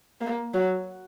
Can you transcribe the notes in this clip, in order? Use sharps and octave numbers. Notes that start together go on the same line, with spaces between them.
A#3
F#3